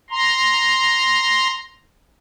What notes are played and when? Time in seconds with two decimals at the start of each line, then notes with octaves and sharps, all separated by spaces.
0.11 A#5 C6